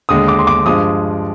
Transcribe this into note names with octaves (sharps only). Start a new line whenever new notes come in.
D#2 D3 G#3 D#6
D6
C6
D6
G2 F3 G#3 D#6